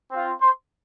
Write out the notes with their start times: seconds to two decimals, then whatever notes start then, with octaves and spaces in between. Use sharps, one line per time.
0.11 C4 F4
0.40 C5 C6